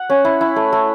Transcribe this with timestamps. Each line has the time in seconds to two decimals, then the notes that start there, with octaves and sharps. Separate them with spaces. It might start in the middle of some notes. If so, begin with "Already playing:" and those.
Already playing: F#5
0.10 C#4
0.25 E4
0.41 E4
0.56 A3
0.73 A3